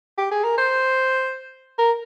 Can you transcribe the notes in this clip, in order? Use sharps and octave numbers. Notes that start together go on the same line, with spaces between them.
G4
G#4
A#4
C5
A#4